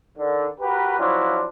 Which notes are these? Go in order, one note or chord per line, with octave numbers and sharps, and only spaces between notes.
D3 D#3
F#4 G4 A#4 B4
F3 F#3 C#4 D4 E4 F4